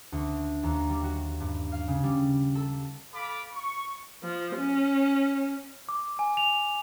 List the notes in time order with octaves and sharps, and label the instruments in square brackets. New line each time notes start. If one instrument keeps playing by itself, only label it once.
[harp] D2
D#2
G3
F#4
G2
F5
C#3
G3
A4
[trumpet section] A4 F5 B5 D6
C#6
[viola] F3
C#4
[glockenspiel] D6
G#5
F7